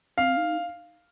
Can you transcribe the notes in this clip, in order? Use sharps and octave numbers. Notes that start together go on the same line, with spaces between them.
C4 F5
D#4